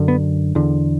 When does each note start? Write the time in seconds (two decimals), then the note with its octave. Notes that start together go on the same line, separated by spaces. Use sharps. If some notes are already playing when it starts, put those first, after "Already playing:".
Already playing: F#2 D3
0.08 B3
0.55 E2 D3